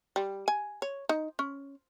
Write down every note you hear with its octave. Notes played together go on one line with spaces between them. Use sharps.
G3
G#5
C#5
D#4
C#4